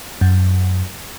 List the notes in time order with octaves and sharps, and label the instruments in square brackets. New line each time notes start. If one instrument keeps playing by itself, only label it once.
[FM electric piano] F#2